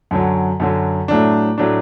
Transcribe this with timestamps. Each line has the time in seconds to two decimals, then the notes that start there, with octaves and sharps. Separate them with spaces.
0.11 F#2 D3 F#3
0.60 F#2 D3 F#3
1.08 A2 F#3 A3 D4
1.58 A2 F#3 A3 D4